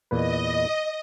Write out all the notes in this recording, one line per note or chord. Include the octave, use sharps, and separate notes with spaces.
E2 A#2 B4 D#5